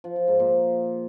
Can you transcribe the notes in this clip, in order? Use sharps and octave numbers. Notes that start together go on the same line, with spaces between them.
F3
F3
G#2
A#2